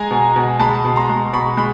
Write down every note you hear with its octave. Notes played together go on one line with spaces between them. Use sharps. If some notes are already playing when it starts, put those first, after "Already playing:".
Already playing: G#3 G#5 A#5
B2
B2
G#3 A5 B5
B2
A#5 C6
G#3
B2 B5 C#6
G#3 B5